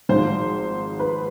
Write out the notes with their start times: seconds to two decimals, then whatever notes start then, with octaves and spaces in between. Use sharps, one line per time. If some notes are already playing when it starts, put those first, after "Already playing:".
0.09 G#1 G#2 F3 C5
1.00 B4